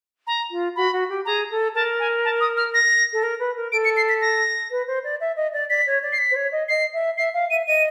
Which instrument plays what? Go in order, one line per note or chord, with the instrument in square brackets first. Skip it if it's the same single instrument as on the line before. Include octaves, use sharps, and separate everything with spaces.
[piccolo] A#5
[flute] F4
[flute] F#4 [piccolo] B5
[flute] F#4
G4
[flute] G#4 [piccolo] A#5
[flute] A4
[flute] A#4 [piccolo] A5
[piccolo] G#5
A5
D#6
F6
A#6
[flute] A4
A#4
B4
A#4
[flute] A4 [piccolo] D7
[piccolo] C#7
C7
B6
A#6
[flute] B4
C5
D5
E5
D#5
D5
[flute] D5 [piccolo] B6
[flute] C#5
D5
[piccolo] C7
B6
[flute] C5
C#5
D#5
[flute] D#5 [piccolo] C7
[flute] E5
[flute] E5 [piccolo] C7
[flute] F5
[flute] E5 [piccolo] D#7
[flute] D#5 [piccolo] D#7